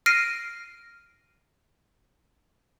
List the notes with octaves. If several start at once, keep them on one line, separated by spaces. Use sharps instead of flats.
F6 A#6 C7 D7 D#7